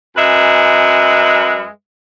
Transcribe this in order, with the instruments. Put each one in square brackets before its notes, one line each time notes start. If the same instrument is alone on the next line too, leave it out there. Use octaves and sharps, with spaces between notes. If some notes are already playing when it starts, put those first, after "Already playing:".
[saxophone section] F#2 G#3 B4 E5